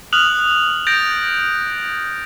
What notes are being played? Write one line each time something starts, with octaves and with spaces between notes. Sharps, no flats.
D#6 F6 F#6 F7 F#7
G6 A6 A#6 D7